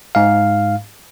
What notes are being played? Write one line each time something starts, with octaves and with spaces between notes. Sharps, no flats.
G#2 F5